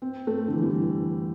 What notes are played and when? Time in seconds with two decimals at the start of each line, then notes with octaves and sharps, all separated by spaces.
0.02 C4
0.27 A3
0.48 D3
0.53 E3
0.62 G3
0.70 E3